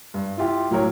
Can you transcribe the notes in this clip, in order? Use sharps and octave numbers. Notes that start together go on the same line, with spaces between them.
G2
E4 F4 G4
A2 F#3 A#4 C#5